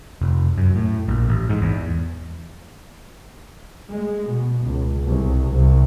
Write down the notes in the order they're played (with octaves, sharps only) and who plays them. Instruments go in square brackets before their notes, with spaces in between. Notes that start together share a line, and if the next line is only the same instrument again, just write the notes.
[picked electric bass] F1
F#2
A2
A#1
A1
G#2
E2
[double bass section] G#3
B2
C#2
C2
C2